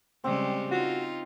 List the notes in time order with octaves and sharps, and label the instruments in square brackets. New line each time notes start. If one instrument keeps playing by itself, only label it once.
[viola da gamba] C#3 G3 G#3 [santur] C4
[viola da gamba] D#4 F4 [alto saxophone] F#4